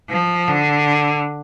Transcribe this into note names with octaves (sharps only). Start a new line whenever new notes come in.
F3
D3